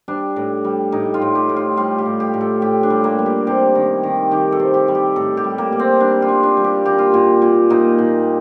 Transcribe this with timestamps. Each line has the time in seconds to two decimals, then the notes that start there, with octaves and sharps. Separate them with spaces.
0.08 G3 D4
0.36 A2
0.64 G3
0.92 A2 D#4
1.14 F4
1.22 A2
1.35 G4
1.49 A2
1.56 F4
1.77 G3 F4
1.98 G4
2.06 A2
2.20 G4
2.34 A2
2.41 A4
2.62 A2 G4
2.83 D4
2.90 G3
3.04 A#3
3.19 G3
3.26 G4
3.47 C3 G4
3.75 D#3
4.03 D#3
4.31 D#3 G4
4.52 A4
4.60 C3
4.74 G4
4.88 G3
4.95 G4
5.16 A2 A4
5.37 G4
5.44 G3
5.58 A#3
5.72 G3
5.79 C4
6.00 G3 D4
6.22 F4
6.29 G3
6.43 D4
6.57 G3
6.64 G4
6.85 A#2 G4
6.99 F4
7.12 A#2 G4
7.42 A#2
7.70 A#2 D#4
7.99 A#2